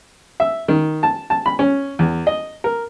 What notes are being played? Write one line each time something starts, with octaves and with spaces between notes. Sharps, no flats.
E5
D#3
A5
A5
B5
C#4
E2
D#5
A#4